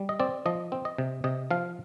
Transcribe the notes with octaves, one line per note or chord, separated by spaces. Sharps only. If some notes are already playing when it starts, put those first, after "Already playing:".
Already playing: G3
D#5
C4 D5
F3 D#5
C4
D#5
C3
C3 D#5
F3 F5